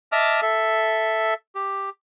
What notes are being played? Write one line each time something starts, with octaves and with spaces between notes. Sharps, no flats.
D#5 E5 A5 D6 D#6 F6
A4 E5
G4